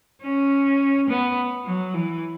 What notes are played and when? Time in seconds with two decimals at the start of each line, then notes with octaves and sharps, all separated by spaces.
0.23 C#4
1.09 B3
1.65 F#3
1.94 E3